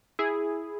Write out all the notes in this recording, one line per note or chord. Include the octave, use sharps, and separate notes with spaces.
E4 G#4